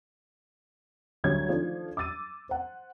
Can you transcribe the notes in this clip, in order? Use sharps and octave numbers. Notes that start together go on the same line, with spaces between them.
D2 D3 F#3 G3 C#5 G#6
D#3 F3 A3 D4
D6 E6 A6 D#7
C5 F#5